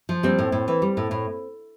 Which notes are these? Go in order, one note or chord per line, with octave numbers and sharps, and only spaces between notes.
F3
G3 C4
A2
A2
E3
G3
A2
A2